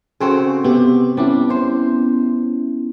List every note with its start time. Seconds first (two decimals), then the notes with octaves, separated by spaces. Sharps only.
0.21 C#3 C4 F#4 G#4 A4
0.64 C3 B3 G4
1.17 G3 B3 C#4 D4 E4
1.50 C5